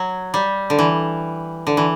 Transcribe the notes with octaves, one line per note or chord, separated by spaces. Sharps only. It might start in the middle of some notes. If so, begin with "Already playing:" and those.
Already playing: F#3
G3
D3
E3
D3
E3